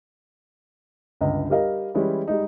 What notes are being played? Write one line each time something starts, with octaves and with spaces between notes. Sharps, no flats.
G1 C#2 D#5
G3 G4 A#4 D#5 F5
E3 G3 G#3 C#4 E4
G3 G#3 D#4